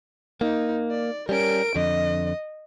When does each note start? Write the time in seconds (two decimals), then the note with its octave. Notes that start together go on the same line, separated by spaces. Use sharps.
0.41 A#3 D#4
0.91 D5
1.29 G3 C#4 A#4 D7
1.76 F2 D3 D#5